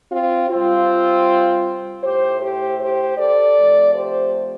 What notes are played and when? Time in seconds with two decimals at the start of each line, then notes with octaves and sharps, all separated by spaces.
0.12 C4 F4
0.50 C3 G3 C4 F4
2.03 A2 A3 G4 C5
2.41 G4 C5
2.79 G4 C5
3.18 A4 D5
3.56 C3 F3 A3
3.94 G4 C5